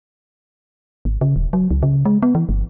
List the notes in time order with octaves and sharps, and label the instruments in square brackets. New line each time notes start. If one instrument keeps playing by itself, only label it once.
[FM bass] G#1
C#3
D#1
F#3
C#2
C#3
G#3
B3
E3
G1